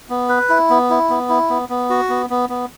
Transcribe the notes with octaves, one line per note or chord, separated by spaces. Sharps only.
B3
B4
E4
B3
E4
B3
E4
B3
B3
F#4
B3
B3
B3